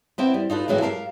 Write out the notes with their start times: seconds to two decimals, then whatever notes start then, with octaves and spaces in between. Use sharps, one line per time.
0.18 B3 C4 E4 G5
0.34 G3
0.50 D#4 F4 A4 B4
0.68 A2 E3 F#3 G#3 A#3
0.81 G4 A4 A#4 C5 F5